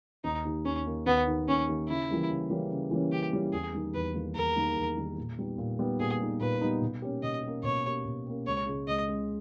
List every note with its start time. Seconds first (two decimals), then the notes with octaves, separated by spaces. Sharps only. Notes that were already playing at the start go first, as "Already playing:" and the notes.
0.24 D#2 D#4
0.45 D#3 A#3 D#4 G4
0.65 D#2 C#4
0.86 D#3 A#3 D#4 G4
1.06 D#2 B3
1.27 D#3 A#3 D#4 G4
1.48 D#2 C#4
1.69 D#3 A#3 D#4 G4
1.88 C#3 E4
2.09 E3 G3 A#3 C#4
2.29 C#3
2.50 E3 G3 A#3 C#4
2.71 C#3
2.91 E3 G3 A#3 C#4
3.12 C#3 G4
3.33 E3 G3 A#3 C#4
3.53 E2 G#4
3.73 D#3 G3 A#3 D#4
3.94 E2 B4
4.14 D#3 G3 A#3 D#4
4.35 E2 A#4
4.56 D#3 G3 A#3 D#4
4.76 E2
4.97 D#3 G3 A#3 D#4
5.18 A#2
5.38 G3 B3 D#4
5.58 A#2
5.79 G3 B3 D#4
6.00 A#2 G#4
6.21 G3 B3 D#4
6.40 A#2 B4
6.61 G3 B3 D#4
6.82 B2
7.02 A#3 C#4 G4
7.23 B2 D#5
7.43 A#3 C#4 G4
7.64 B2 C#5
7.85 A#3 C#4 G4
8.05 B2
8.26 A#3 C#4 G4
8.46 C#2 C#5
8.66 C#3 G#3
8.88 C#2 D#5
9.09 C#3 G#3